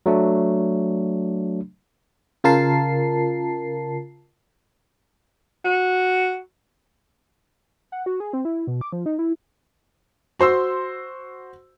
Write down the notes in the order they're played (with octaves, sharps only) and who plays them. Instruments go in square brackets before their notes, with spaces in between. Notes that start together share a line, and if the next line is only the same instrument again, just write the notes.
[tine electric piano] F#3 A3 D4
[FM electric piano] C#3 F4 A#4 A5 C7
[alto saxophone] F#4
[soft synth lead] F#5
F#4
G#4
C4
E4
B2
D6
F3
D#4
E4
[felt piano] F#4 C5 C6 E6